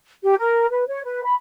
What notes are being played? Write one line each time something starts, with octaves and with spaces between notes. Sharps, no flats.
G4
A#4
B4
C#5
B4
B5